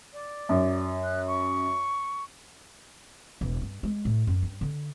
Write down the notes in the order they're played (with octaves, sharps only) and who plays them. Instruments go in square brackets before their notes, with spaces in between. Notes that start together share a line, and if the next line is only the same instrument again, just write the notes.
[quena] D5
[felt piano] F#2
[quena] F#6
C#6
[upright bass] E1
G2
G#3
A2
F#2
G2
D3